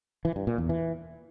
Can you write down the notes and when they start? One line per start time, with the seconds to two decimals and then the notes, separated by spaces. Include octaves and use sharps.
0.25 E3
0.36 G2
0.47 A#2
0.58 E2
0.69 E3